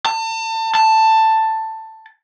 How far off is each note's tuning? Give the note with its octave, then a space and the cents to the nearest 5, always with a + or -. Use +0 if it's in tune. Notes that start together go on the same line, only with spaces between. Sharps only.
A5 +35
A5 +10